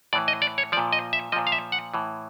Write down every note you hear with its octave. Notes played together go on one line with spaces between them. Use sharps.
A2 E3 D5
D#5
D5
C#5
A#2 F3 D5
D#5
E5
A#2 F3 D#5
F5
E5
F#5
A2 E3